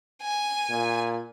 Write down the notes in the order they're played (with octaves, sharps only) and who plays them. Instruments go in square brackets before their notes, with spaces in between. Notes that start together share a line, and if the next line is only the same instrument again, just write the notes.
[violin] G#5
[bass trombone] A#2